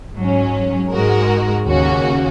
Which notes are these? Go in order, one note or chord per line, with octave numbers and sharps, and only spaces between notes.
G#2 F#3 C#4
G#2 G#3 F#4 A#4
D#2 C#3 A#3 C#4 F#4